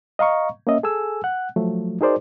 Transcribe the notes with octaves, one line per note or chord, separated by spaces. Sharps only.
D#5 F5 A#5 C#6
A#3 C#4 D#5 E5
G#4 A4 G#5 E6
F#5 F#6
F3 F#3 A3
D#4 F#4 G#4 A#4 C5 D5